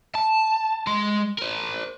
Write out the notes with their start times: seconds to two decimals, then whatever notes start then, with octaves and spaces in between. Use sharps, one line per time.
0.15 A5
0.87 G#3 C6
1.38 A#4 C5